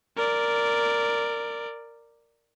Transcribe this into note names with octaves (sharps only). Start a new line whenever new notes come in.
A#4 D5